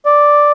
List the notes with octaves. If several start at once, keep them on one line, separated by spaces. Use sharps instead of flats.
D5